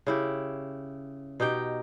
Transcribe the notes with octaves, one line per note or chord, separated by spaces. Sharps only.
C#3 E4 G4
B2 D#4 G4 G5